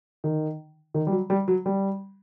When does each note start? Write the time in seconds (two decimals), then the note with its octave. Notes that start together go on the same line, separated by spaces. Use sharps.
0.24 D#3
0.94 D#3
1.07 G3
1.12 F#3
1.30 G3
1.48 F#3
1.66 G3